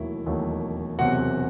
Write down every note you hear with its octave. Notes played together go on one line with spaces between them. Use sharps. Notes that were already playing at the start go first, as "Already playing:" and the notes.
Already playing: E1 D#2 D#3 F#3 A3 E4
E1 D#2 D#3 F#3 A3
E1 E2 C3 F#3 C4 F#4 F#5